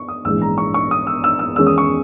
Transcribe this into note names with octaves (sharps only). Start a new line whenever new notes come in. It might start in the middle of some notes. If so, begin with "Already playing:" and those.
Already playing: C#6
D#6
A#1 G#2 E3 G#3 E6
A#5
C#6
C#6
D#6
E6
E6
E6
E2 D#3 G#3 C#4 E6
D#6
C#6